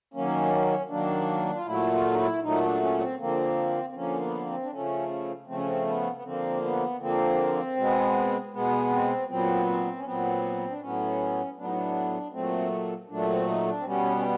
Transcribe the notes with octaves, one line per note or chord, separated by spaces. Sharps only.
D#3 F#3 A#3 C#4
D#3 F#3 A#3 D4
F4
A#2 F#3 A3 E4
F4
D#4
E4
A#2 F#3 A3 D#4
D4
C#4
C4
D3 F3 A#3 C4
C4
D3 F3 A#3 C#4
B3
C4
D4
C#3 F3 A3 C#4
C#3 F3 A3 C4
C#4
C4
B3
B3
D3 F3 A#3 C4
B3
D3 F3 A#3 C4
B2 G#3 B3
B2 G#3 B3
C4
A#2 F#3 B3 C4
C4
C#4
A#2 F#3 B3 C4
D4
A2 F#3 B3 C#4
A2 F#3 B3 D4
D#4
D4
A#2 F#3 A3 C4
A#2 F#3 A3 D4
C4
D#4
D4
C4
B2 G3 B3 C#4
C#4